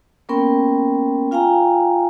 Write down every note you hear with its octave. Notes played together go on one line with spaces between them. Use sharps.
A#3 B3 C#4 A#4 G5 C6
F4 F5 G5 G#5 A#5